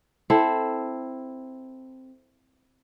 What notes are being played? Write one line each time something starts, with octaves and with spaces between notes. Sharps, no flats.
C4 E4 A4